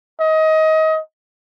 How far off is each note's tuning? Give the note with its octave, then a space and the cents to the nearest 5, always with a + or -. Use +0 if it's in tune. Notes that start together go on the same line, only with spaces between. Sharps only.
D#5 +25